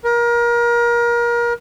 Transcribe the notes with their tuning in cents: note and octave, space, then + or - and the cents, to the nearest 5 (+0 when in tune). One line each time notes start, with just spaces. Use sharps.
A#4 +30